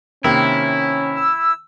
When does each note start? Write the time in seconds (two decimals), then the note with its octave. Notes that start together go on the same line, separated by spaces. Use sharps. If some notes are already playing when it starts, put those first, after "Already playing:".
0.24 C3 D#3 A#3 C#4 E4
1.16 E6